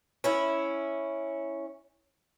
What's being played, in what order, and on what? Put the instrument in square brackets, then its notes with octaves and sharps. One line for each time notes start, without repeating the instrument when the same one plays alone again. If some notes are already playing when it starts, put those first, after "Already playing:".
[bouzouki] C#4 E4